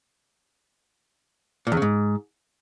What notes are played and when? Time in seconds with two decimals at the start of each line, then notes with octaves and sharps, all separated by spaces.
1.67 A#2
1.72 E2
1.77 C#3
1.82 G#2